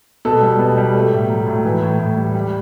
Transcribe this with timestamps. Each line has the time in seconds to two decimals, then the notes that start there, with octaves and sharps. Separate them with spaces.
0.25 B2 A4
0.42 G3
0.59 B2
0.77 G3
0.95 A3
1.11 A2
1.29 F#3
1.47 A2
1.65 E3
1.82 A2
1.99 A2
2.17 G3
2.35 G3